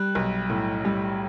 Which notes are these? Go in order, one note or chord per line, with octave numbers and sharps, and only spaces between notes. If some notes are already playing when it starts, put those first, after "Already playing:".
Already playing: G3 F#6
B1
A2
G3